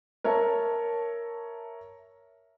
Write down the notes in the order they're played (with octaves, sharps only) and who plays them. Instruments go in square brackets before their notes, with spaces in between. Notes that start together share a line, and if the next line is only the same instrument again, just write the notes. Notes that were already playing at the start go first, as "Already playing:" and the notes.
[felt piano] A#4 C#5 E5 A5